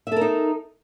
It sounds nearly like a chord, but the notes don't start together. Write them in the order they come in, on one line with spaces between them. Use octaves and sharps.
E5 A4 A#4 D#4